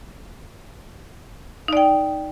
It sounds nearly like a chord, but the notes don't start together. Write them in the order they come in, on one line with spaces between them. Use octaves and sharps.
D#4 D5 G5